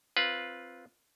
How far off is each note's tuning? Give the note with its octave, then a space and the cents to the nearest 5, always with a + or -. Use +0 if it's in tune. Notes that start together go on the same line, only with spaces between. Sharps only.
C4 +0 F4 +0 B4 -10